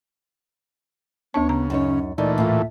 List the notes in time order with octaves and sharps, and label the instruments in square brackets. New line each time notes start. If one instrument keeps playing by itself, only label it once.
[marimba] D2 D4 A5 [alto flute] B3 [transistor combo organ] C#5
[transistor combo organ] C#3 [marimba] A#5
[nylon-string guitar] F#2 D#4 C#5 [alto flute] C#4
[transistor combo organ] A#2 E3 A3 [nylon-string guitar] D#4 [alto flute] D5
[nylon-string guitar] A2 F4 [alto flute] E5